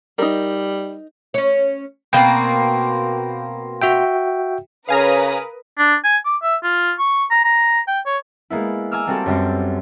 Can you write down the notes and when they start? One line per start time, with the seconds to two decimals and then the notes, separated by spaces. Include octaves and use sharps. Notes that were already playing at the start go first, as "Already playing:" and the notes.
0.18 G3 D#4 A#4
1.34 C#4 C#5
2.13 B2 A#3 C4 G5
3.82 F#4 E5 G5
4.89 C#3 A#4 B4 F5 G#5 A#5 D#6
5.78 D4
6.04 G#5
6.25 D6
6.43 E5
6.63 F4
6.99 C#6
7.31 A#5
7.45 A#5
7.88 G5
8.06 C#5
8.50 G#3 A#3 B3 E4
8.92 G#5 A#5 D6 E6 F6
9.07 G3 A#3 C4 F#4 A4
9.26 F#2 G3 B3 C4